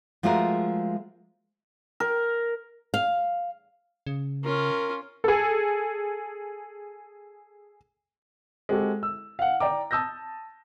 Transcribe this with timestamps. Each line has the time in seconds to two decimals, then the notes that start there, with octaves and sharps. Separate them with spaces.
0.23 F3 G#3 A3 F4 F#4 A#4
2.00 A#4
2.94 F5
4.07 C#3
4.44 C#4 F4 A#4
5.24 G#4 A4
8.69 G#3 C4 F#4 G4 A4
9.03 E6
9.39 F5 F#5
9.60 D5 G5 A#5 D6
9.91 A5 D#6 E6 G6 A#6